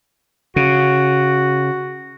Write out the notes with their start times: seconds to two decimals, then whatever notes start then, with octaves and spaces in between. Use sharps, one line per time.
0.56 C#3 F#4